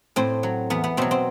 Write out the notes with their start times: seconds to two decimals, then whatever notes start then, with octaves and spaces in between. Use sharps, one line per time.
0.16 A2 C4
0.43 F#3
0.70 E2 B3
0.84 B3
0.97 B2 F#3 C4
1.11 C4